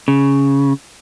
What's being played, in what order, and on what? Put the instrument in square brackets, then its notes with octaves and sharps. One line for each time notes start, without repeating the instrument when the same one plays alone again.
[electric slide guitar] C#3